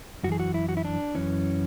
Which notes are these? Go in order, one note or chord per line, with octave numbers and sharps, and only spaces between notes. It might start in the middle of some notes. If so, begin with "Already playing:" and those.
F#2 E3 F#4 G#4
F#4
E4
F#4
E4
D4
F#2 E3 C#4